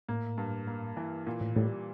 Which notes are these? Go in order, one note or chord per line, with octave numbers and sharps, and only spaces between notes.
A2 A#3
G2
A#3
E3
A#2
A2
A2 G3